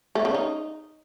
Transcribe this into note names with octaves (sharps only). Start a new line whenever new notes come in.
A3
C#3
D#4